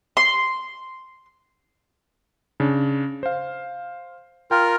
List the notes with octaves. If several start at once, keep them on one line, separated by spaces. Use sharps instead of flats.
C6
C#3 D4
C5 F5
F4 A#4 G5